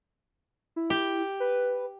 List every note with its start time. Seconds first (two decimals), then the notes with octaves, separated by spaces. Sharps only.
0.76 E4
0.90 G4
1.40 B4